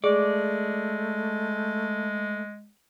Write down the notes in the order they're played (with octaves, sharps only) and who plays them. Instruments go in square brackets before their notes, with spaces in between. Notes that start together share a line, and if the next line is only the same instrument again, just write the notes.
[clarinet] G#3 [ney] A3 [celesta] G#4 [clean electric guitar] D5